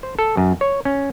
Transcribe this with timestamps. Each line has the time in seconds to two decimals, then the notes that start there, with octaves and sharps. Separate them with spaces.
0.03 C5
0.19 A4
0.37 F#2
0.61 C#5
0.85 C#4